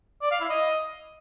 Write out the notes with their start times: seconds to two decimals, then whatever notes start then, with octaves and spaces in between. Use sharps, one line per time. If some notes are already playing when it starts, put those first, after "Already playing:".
0.22 D5
0.31 F5
0.40 E4
0.50 D#5